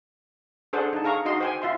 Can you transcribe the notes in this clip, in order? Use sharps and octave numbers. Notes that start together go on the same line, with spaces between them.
D4 G#4 A4 C5 D5 F#5
D#4 A5
G#4 F5 A#5 C#6
D#4 F#4 D#5 C6
C5 G5 G#5
F4 E5 C6